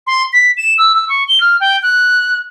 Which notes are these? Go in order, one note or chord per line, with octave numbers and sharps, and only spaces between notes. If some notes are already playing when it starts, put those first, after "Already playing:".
C6
B6
E7
E6
E6
C#6
G7
F6
G5
F#6